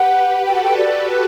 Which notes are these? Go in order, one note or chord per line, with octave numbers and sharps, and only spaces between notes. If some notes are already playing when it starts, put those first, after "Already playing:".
Already playing: G4 B4 F#5
F#4 A4 G5
F#5
G5
D5
B4